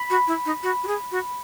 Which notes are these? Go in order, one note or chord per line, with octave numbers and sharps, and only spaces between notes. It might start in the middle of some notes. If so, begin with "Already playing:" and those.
Already playing: B5
F#4
E4
D#4
F#4
F#4
G#4
F#4